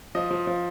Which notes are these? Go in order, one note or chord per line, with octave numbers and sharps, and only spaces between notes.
F3 D#5
F3
F3